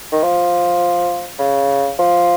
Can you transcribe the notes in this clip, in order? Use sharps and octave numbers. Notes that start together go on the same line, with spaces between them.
D#3
F3
C#3
F3